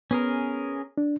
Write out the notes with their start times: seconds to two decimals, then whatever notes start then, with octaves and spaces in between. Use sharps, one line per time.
0.11 B3 C#4 G#4 A#4
0.98 D4